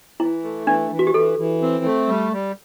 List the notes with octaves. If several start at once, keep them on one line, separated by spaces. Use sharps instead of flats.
E3 E4
A3
E3 D4
E3
F#4
G4
E3 A4
E3
C4
A3
G3
G3